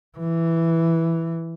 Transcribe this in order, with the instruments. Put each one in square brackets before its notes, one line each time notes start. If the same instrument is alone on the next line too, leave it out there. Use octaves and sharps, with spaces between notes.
[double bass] E3